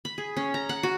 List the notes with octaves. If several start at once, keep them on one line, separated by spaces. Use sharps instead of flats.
B5
G#4
C#4
A#5
F#5
F#4